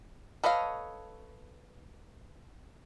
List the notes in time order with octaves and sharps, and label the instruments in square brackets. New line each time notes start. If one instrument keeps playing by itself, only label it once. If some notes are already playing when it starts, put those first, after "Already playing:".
[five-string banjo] A4 B4 C#5 D#5 F5